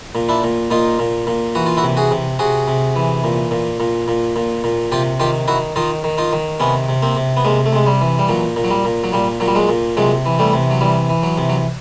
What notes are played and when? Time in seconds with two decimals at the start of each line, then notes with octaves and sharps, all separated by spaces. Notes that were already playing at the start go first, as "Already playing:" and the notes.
0.15 A#2
0.29 D4 E4
0.44 A#2
0.71 A#2 D#4 F4
0.99 A#2
1.27 A#2
1.55 E3 F#4
1.66 F4
1.77 E4 F#4
1.83 C3
1.97 F#4 G#4
2.11 C3
2.39 C3 F#4 G#4
2.68 C3
2.96 E3
3.24 A#2
3.51 A#2
3.80 A#2
4.08 A#2
4.36 A#2
4.64 A#2
4.92 C3 F4 G4
5.20 D#3 F4 G4
5.48 D#3 E4 F#4
5.76 D#3 D#4 F4
6.04 D#3
6.18 D#4 F4
6.33 D#3
6.60 C3 B3 C#4
6.89 C3
7.02 A#3 C4
7.17 C3
7.37 B3
7.45 C3 G#3 A#3
7.66 A3
7.73 C3 G#3
7.86 G3
8.01 E3
8.19 G3
8.29 A#2 F#3
8.56 A#2
8.64 F#3
8.71 G3
8.85 A#2
9.04 F#3
9.13 A#2 G3
9.40 A#2 F#3
9.48 G3
9.55 F#3 G#3
9.69 A#2
9.97 C3 F#3 G#3
10.26 E3
10.39 G3 A3
10.53 C3
10.71 F#3
10.81 E3 G3
11.09 E3
11.23 F#3
11.38 C3
11.49 F#3